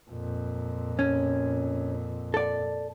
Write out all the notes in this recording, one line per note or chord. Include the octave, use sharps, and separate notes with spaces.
F2 A#2
C#4
A4 D5